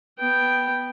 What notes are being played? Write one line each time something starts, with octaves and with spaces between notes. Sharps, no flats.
B3 G5